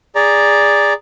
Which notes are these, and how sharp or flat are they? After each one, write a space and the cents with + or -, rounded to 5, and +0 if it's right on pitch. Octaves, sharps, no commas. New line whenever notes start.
G#4 -15 D5 -10 A#5 +0